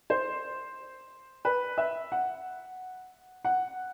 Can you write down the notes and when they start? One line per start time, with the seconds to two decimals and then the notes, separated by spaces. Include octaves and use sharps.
0.10 C5
1.45 B4
1.78 E5
2.12 F#5
3.45 F#5